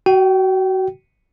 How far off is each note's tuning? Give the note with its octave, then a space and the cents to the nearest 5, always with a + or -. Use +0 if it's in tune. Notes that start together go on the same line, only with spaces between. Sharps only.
F#4 +25 G5 -25